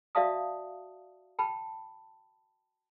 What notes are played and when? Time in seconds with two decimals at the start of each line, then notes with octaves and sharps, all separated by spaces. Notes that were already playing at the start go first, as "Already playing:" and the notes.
0.15 F#4 D5 E5 F5 A5 D#6
1.39 G5 A5 B5